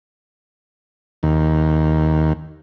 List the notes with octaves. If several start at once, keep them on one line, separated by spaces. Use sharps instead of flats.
D#2